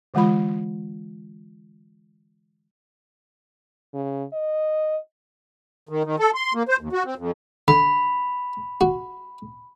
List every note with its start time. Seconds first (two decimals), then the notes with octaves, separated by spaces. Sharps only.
0.14 D3 E3 G#3 F4 B5
3.94 C#3
4.33 D#5
5.89 D#3
6.05 D#3
6.19 A4
6.35 C6
6.54 A#3
6.68 C5
6.81 D#2
6.93 F#4
7.05 C4
7.18 F2
7.68 D3 B5
8.81 F#4